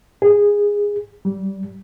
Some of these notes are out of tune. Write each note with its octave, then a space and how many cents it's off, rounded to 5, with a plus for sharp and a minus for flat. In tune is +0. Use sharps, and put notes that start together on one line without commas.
G#4 -15
G3 -20